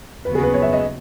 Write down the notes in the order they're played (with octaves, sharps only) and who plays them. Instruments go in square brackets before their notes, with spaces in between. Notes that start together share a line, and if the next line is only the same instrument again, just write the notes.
[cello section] D#2 C#3 F#3 B3 F#4 [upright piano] B4
[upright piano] G#4
B4
C#5
E5
D#5